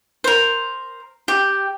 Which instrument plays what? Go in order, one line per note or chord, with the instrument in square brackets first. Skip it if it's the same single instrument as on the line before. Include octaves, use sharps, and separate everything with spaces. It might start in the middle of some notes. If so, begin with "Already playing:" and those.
[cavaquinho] A#4 C5
G4